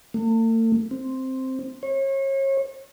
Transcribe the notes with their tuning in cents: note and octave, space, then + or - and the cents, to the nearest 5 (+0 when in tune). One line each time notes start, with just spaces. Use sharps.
A3 +45
C4 +0
C#5 -35